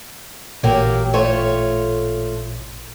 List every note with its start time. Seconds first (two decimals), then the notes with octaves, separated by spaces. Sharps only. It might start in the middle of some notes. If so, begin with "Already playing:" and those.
0.63 A1 A#2 F#3 A#3 G4
1.14 A3 F4 C#5